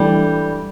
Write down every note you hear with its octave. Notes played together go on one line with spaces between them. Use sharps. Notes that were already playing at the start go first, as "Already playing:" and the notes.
Already playing: E3 G3 A3 D4 G4